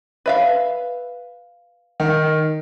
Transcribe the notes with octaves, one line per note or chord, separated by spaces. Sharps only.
B4 E5 F5
D#3